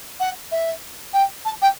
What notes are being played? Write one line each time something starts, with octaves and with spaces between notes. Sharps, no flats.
F#5
E5
G5
A5
G5